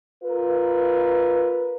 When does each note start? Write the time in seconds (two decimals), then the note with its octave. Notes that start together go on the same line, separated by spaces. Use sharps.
0.23 F4 A#4 B4